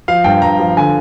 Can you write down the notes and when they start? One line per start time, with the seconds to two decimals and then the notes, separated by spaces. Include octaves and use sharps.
0.08 F3 F5
0.24 G2 G5
0.42 G2 A#5
0.59 F3
0.77 D3 G#5